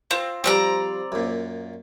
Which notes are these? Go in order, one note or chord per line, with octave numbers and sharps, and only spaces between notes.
C4 F4
F3 G3 C4 D5 A#5
F#2 A#2